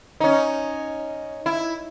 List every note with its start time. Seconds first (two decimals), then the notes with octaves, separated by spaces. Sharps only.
0.20 C#4 D#4
1.46 E4